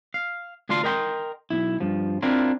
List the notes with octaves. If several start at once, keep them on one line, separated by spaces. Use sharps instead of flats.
F5
D2 D4 F4 F5 C6
A#4 D#5 G5 B5 C6
B1 E4
G2 F3
C4 D4 E4 F4 A#4